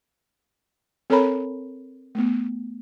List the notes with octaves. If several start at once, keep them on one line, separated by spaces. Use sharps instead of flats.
C4 A4 A#4 C#5 A#5 B5
A3 B3